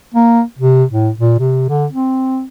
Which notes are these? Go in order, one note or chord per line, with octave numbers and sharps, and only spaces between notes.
A#3
C3
A2
A#2
C3
D3
C4